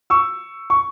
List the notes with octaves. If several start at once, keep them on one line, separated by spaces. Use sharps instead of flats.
C#6 E6
C#6